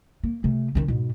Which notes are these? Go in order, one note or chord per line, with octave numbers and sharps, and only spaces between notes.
A#3
C3 A3
D#3 C#4
G#2 B2